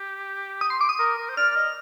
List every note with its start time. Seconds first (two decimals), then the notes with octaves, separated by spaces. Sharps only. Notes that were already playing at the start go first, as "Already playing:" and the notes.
Already playing: G4
0.61 D#6
0.70 C6
0.81 D6
0.89 D#6
0.99 A#4
1.18 A#4
1.29 C5
1.37 D5 F6
1.56 D#5